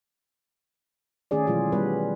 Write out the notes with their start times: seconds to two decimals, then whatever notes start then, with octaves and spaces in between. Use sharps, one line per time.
1.31 D#3 A3 C#4 G#4 D5
1.47 B2 E3 F#3 G#3 F4 G#4
1.72 G3 B3 B4